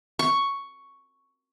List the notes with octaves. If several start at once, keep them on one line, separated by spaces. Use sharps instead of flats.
C#6